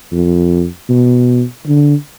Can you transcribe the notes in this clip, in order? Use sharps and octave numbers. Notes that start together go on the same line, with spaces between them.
F2
B2
D3